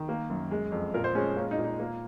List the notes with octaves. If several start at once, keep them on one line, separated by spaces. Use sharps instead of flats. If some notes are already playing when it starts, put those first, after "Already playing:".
Already playing: D#3
A#3
F#2
G#3
F2
A#2 A#4
C5
G#3 C#4
A#3 C#4
D#4
A#2
D#4
A#3